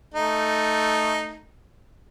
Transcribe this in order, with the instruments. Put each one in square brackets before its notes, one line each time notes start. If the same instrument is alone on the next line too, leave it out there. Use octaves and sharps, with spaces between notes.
[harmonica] A3 D#4